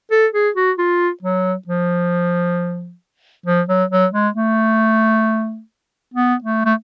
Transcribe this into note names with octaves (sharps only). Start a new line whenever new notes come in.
A4
G#4
F#4
F4
F#3
F3
F3
F#3
F#3
G#3
A3
B3
A3
A3